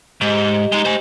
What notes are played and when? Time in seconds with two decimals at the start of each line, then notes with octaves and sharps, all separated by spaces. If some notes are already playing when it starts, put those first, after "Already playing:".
0.21 G#2 G4 D#5
0.72 G#3 D#4
0.85 C5 G#5